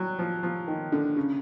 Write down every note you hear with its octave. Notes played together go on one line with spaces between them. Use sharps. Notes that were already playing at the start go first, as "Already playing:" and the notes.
Already playing: F#3 G3
F3
F3
D#3
D3
C#3